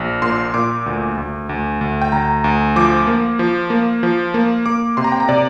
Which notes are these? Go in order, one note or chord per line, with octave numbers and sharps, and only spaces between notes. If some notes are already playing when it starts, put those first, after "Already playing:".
Already playing: A#1
A#2 C6
A#2 D6
D2
D2
D2
D2
G5
D2 A#5
D2
F3 D6
A#3
F3
A#3
F3
A#3
A#3 D6
C3 C6
A#5
G5
A#5
C3 D5